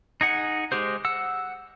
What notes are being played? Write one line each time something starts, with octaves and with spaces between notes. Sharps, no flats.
D#4 G#4 F#5
G#3 G4 G#4 C5
F#5 E6